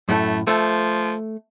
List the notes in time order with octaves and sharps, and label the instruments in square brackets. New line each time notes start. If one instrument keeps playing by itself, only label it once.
[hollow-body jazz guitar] F#2 A2 [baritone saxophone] A3
[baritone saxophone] F3 [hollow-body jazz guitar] A3